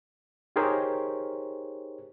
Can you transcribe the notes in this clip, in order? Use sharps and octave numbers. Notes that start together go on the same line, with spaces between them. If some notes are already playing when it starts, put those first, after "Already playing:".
D#4 G4 G#4 A#4 C5 C#5